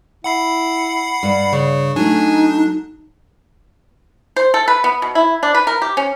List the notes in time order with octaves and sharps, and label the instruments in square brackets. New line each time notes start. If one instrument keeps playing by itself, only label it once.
[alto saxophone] E4 [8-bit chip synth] F#5 B5 C7
[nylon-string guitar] G2
[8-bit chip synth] C#3 [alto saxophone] C#5
[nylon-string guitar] F#3 A3 [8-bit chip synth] D4 [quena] D#4 [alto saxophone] G#5
[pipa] C5
A4
B4
B3
B2
E4
D4
B4
A#4
G4
C#4